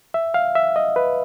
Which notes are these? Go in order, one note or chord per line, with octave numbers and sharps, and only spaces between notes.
E5
F5
E5
D#5
B4